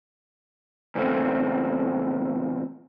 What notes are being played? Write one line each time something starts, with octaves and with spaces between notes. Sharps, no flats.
E2 A#2 C#3 A3 C4